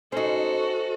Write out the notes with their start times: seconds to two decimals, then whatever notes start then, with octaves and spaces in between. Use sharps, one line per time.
0.12 C#4 D#4 F#4 A4 C5